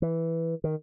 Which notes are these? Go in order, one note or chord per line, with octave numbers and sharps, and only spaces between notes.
E3
D#3